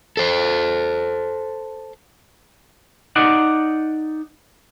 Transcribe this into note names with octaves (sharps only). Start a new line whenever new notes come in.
A4 C5
D#4 D5 F#5